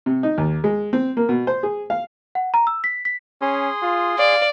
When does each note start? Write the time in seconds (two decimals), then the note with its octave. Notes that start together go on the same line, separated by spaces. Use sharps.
0.06 C3
0.23 D#4
0.38 D#2
0.64 G#3
0.93 C4
1.17 A#3
1.29 B2
1.47 C5
1.63 G#4
1.90 F5
2.35 F#5
2.54 A#5
2.67 E6
2.84 B6
3.05 B6
3.42 C#4 G#4 C6 D#6
3.83 F4
4.18 D5 F5